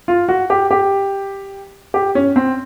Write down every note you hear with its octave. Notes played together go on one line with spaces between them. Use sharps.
F4
F#4
G4
G4
G4
C#4
C4